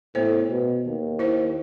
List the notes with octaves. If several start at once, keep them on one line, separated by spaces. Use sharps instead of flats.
A2 B3 C5
B2
D#2
E4 C5